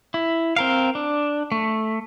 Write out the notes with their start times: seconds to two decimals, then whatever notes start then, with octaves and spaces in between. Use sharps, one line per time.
0.14 E4
0.56 C4 A#4 F5
0.95 D4
1.52 A3